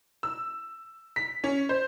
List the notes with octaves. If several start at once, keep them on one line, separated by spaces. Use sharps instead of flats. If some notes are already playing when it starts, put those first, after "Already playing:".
E6
B6
C#4
C5